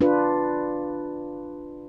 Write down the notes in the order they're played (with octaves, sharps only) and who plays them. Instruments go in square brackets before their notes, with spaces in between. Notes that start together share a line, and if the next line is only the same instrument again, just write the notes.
[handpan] D4 F4 B4